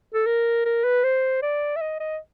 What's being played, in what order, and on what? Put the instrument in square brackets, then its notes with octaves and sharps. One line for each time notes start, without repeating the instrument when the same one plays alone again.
[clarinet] A4
A#4
A#4
B4
C5
D5
E5
D#5
D#5